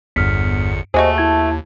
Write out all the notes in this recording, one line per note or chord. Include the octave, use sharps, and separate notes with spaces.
G1 E2 G2 F6 B6 C#7
D#2 A3 F#4 G#4 C5 D#5
E4 A5 G#6